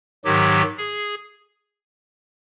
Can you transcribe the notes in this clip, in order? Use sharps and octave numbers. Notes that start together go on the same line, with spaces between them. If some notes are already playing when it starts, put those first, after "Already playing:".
G#2 D#3 F#3 G4
G#4